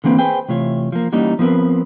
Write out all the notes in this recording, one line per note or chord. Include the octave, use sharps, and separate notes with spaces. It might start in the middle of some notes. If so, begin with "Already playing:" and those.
D3 E3 A#3 C4 B4
G#4 B4 C5 G5 G#5
C3 E3 A3 F4 C#5
F3 A#3
E3 G3 A#3 C#4 D#4
F3 B3 C4 A#4 B4